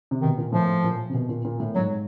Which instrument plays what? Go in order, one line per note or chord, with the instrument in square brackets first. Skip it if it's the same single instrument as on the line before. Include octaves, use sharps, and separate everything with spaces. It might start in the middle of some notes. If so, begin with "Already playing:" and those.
[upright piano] C3
[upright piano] B2 [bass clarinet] D#3
[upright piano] A#2
[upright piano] A2 [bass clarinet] F3
[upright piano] A#2
C3
B2
A#2
A#2
A2
[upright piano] G#2 [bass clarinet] F#3